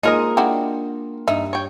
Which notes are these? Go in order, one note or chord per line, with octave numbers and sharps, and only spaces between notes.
G#3 A#3 D#4 F4 G#4 A#4 C5 D#5
D4 E4 F#4 G4
G2 D#4 E5
C#5 G5